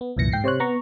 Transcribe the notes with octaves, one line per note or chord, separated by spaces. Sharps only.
B3
C2 F#2 A#2 E3 A#6 C#7
G#2 G5 C7
C3 C5 C#5 F#6
B3 A#5 C#6